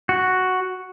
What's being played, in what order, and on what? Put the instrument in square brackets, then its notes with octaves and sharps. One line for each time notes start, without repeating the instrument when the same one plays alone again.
[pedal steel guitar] F#4